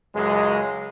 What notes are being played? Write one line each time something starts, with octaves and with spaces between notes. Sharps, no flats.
C#2 F#2 G#3